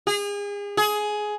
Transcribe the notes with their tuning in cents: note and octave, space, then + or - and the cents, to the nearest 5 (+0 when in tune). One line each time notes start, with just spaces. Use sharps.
G#4 -35
G#4 +15